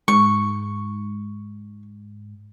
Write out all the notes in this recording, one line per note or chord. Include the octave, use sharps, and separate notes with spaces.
G#2 C#6